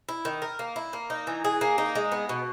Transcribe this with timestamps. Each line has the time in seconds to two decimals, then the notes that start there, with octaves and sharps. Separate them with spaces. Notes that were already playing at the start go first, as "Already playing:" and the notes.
0.09 E4
0.25 D#3
0.42 A#4
0.59 A#3
0.76 E4
0.93 A#3
1.10 D#4
1.27 E3
1.44 G#4
1.61 A#3
1.78 D#4
1.95 G#3
2.12 B3
2.29 B2